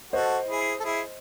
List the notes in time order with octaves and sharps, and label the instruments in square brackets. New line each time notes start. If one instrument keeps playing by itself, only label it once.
[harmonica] F#4 A4 [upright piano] C5 D#5
[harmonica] E4 G#4
A4
E4 G#4